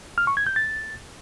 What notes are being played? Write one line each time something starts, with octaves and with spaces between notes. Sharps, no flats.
F6
C#6
G#6
G6
A6